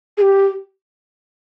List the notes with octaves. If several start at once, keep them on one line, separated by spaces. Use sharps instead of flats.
G#4
G4